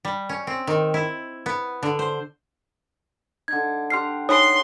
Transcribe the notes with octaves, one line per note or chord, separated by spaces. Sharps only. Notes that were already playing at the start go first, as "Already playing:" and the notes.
G3
C#4
C4
D#3
E4
B3
D3
C5
D3 D#4 G#6
D4 G4 C6 F6 C7
D#4 C#5 C6 D#6